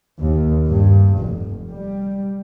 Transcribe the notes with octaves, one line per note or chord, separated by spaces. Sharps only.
D#2
G2
F1
G3